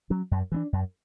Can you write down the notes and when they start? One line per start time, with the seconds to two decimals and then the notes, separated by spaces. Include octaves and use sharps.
0.10 F#3 C#4
0.31 F#2
0.52 E3 B3 D4
0.73 F#2